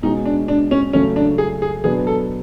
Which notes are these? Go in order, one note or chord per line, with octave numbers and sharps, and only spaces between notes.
B2 G#3 C#4 D#4 F#4
D4
D4
C#4
C#3 F#3 A3 C#4
D4
G#4
G#4
B2 F#3 B3 D4 G#4
A4